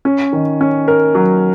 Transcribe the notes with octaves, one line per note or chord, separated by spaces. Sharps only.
C#4
D#3
C#4
A#4
F#3